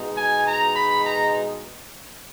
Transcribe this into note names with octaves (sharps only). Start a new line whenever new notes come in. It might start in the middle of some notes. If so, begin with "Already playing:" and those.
Already playing: B2 G#3 D#4
G#5
A#5
B5
A#5